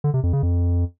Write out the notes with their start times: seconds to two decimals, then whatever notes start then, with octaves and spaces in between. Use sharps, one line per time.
0.04 D3
0.14 C3
0.23 F2
0.33 C#3
0.43 F2